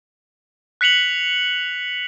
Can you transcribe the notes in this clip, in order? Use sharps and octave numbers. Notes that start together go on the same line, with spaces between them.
F#6 B6 C#7 F7 F#7